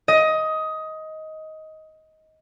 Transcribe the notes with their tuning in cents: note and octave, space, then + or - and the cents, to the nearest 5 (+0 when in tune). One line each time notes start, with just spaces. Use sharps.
D#5 +15